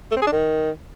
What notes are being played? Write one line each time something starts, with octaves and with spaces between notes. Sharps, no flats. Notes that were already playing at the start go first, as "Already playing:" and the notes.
A3
C4
G#4
D4
D#3